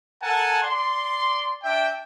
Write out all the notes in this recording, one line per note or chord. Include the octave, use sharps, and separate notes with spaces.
A4 A#4 F#5 G#5 A5
D5 C6
D4 E5 G5